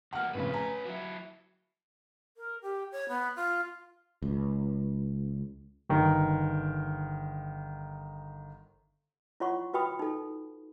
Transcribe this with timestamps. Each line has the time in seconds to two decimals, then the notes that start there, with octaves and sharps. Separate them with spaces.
0.13 C2 A#3 F#5 F6
0.34 A1 F2 C#3 C#4 B4
0.53 G#5 A#5
0.86 F#3 E4
2.36 A#4
2.62 G4
2.92 C#5
3.09 B3
3.36 F4
4.22 C#2
5.90 G1 D#3
9.40 E4 F4 C#5 F#5 C6 C#6
9.74 F#4 B4 G5 B5 D#6
9.99 D#4 A4